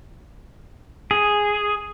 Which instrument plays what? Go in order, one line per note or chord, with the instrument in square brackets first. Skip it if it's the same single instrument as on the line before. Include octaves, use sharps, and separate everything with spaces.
[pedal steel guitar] G#4